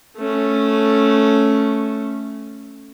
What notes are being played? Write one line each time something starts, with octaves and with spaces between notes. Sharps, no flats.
A3 C#4